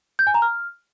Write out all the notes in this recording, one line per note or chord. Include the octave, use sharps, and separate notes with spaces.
G6
G#5
A#5
F6